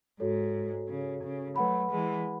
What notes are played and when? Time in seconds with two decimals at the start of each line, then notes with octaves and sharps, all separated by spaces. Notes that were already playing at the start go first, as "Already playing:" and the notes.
0.19 G#2 F#4 A4 C#5
0.88 C#3
1.23 C#3
1.56 F#3 A3 B4 F#5 B5
1.90 E3 G#3